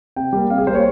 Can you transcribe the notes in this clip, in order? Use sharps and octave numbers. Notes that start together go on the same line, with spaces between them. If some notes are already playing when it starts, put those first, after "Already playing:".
C3 G5
G3 A#3
C3 F5
G#4
G3 A#3 C5 C#5